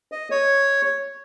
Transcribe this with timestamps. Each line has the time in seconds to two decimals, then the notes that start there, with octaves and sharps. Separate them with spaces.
0.12 D#5
0.31 C#5